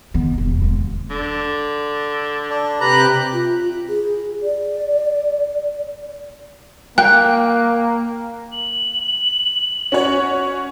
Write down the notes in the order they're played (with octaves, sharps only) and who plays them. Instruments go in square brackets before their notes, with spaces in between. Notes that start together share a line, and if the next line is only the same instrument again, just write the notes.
[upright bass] D#3 B3
E1
D#2 G#3
[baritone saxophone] D3
[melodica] D4
[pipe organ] C3 G4 F#6 [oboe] B4 [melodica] A#5
[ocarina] F4
G#4
D5
[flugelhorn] A#3 [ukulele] G5 [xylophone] F#6
[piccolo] F#7
[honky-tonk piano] C#4 F#4 C#5